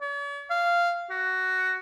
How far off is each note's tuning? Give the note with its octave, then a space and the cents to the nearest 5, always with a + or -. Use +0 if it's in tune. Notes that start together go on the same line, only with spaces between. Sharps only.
C#5 +45
F5 -10
F#4 +10